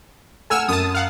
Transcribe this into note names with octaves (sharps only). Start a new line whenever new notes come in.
A4 F#5 G#5 E6 F6
F#2 A5 D#6
F5 F#5